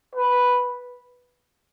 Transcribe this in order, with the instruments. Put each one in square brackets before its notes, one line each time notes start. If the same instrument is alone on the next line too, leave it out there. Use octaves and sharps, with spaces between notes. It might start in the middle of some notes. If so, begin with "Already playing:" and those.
[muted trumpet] B4